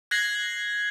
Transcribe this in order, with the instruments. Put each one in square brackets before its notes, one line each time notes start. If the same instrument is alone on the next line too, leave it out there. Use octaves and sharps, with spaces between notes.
[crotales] F#6 G#6 A#6 C7 F#7